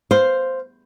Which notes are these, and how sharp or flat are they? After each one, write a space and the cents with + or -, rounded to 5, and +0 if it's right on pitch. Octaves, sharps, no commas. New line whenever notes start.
C5 +0 F5 +0